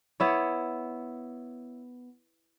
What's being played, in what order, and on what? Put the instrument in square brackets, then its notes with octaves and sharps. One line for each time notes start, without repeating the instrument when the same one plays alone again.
[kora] B3 E4 C#5